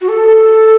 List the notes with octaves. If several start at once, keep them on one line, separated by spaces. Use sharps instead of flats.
F#4
A4